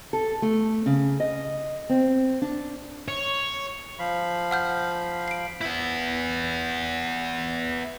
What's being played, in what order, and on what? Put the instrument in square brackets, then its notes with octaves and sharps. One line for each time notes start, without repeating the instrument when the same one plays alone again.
[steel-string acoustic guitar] A4
A3
C#3
D#5
C4
D4
[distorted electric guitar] C#5
[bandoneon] F3 F5 B5
[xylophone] F#5 F6 G6
C7 D7
[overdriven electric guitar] B3 E4